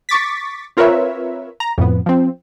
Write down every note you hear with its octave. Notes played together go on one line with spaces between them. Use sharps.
C#6 D6 A6 B6
C4 F4 A#4 B4 C#5 E5
A#5
F2 A2 B3
F3 C4